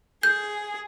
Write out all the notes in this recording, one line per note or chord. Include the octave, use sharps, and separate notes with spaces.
G#4 G6